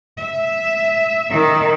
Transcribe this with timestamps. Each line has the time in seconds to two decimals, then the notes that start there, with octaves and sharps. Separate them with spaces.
0.20 E5
1.31 D#3